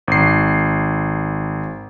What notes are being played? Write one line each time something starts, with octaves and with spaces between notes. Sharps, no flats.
G#1 C7